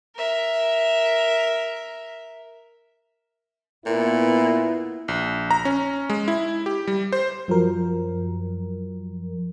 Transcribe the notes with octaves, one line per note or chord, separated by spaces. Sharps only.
A#4 E5
A#2 B3 E4
A#1
A#5
C#4
G#3
E4
G4
G3
C5
F#2 F3 F#3 A#4